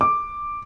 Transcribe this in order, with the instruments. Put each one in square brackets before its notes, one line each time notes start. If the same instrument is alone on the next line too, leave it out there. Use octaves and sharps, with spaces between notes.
[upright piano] D6